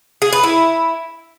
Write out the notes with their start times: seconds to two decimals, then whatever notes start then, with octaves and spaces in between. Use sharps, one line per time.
0.22 G#4
0.33 B4
0.43 E4